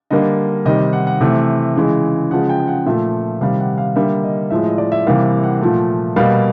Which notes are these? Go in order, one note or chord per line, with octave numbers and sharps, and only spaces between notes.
D3 G3 A#3 D#5
C3 D#3 G3 D#5
F#5
F#5
C3 E3 A3
C#3 E3 G#3
C#3 F3 G#3 F#5
G5
F#5
A#2 F3 A3 E5
C3 D#3 G3 F5
F#5
F5
D3 G3 A#3 E5
D#5
A2 F3 G#3 E5
D#5
D5
E5
C3 E3 G3 A#3 F5
F#5
A#2 F3 A3
B2 G3 A#3 F5